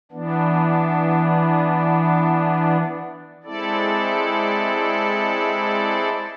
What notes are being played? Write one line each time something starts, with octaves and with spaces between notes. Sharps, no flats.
E3 B3 D4
G#3 C4 E4 A4 D5